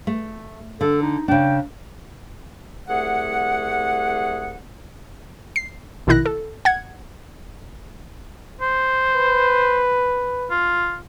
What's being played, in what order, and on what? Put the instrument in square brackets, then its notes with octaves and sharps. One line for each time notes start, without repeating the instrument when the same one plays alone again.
[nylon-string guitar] A3
[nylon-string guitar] D3 [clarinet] A4
[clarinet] D#4
[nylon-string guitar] C#3 D4 [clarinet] G5
[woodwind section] C2 A3 G#4 F#5
[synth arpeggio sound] C7
A#1 B2 D#3 E4 F#6 A#6
A4
F#5 G#6
[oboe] C5
[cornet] B4
[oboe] F4